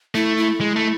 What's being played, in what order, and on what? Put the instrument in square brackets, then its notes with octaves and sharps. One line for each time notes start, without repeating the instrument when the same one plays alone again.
[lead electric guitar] A3 [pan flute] E4
[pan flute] E4
[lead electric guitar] G#3
A3